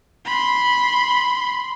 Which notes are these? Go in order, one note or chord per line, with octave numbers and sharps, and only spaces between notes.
B5 C6